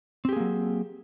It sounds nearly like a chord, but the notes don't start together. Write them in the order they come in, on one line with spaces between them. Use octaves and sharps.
C4 G4 G#4 A#3 F#3